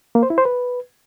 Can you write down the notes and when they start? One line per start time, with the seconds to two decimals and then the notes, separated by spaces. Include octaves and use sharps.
0.15 A#3
0.23 C5
0.30 E4
0.38 C5
0.45 B4